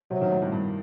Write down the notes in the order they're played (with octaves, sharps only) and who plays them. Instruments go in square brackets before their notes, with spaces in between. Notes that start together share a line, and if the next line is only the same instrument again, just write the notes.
[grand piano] C3 [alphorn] F#3
[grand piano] D#3
A2
G2
G2